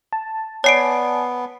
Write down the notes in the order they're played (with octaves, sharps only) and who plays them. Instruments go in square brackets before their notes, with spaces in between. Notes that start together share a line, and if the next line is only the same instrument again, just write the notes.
[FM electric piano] A5
[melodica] B3 [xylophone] C#5 C7 D7 [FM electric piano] D5 G#5 A5